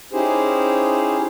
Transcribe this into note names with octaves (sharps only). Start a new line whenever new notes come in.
C#4 D#4 E4 G4 G#4 C5